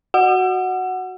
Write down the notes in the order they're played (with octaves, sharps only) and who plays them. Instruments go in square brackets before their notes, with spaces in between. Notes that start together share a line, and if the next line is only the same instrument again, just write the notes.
[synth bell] F#4 F#5